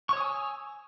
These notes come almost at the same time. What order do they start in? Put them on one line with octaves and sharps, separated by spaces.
C#6 C#5 D#6 G#5 E6